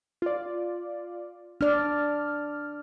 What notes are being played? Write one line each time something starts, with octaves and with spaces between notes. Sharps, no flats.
F4 D5
D4 D5 F6